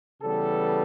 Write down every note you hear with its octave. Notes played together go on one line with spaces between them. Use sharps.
C#3 E3 G3 B3 A4